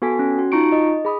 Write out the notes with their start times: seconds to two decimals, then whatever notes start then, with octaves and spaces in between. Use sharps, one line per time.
0.02 B3 F#4 A4 G#5 B6
0.19 C#4
0.39 F#4
0.52 D#4 F4 A#5 C#6 C#7 D7
0.72 D#5
1.05 G#4 B5 D#6